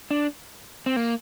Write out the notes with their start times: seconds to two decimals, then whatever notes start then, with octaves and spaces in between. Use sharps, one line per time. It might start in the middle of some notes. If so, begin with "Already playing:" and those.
0.11 D4
0.86 C4
0.96 A#3